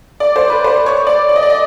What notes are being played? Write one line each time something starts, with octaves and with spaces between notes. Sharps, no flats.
D5
C5
B4
C5
C#5
D5
D5
D#5
D5
D#5